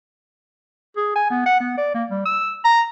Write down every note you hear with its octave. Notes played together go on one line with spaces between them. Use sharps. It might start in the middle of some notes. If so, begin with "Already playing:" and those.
G#4
G#5
B3
F#5
B3
D5
A#3
G3
E6
A#5